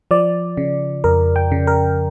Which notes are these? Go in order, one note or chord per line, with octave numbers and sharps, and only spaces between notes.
F3 D5
C#3
F2 A#4
G5
C#3
A#4